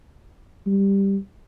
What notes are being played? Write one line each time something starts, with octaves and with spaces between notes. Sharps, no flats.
G3